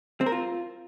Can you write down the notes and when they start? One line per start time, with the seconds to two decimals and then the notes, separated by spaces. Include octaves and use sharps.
0.21 C4
0.26 A#4
0.32 F4